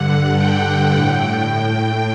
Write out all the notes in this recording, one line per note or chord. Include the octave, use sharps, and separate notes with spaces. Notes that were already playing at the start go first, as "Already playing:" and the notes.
Already playing: G2 D3 F#5
G5
A2